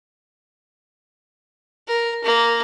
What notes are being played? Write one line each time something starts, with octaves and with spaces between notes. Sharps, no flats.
A#4
A#3